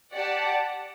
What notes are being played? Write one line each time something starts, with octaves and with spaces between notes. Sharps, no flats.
G4 D5 F#5 A5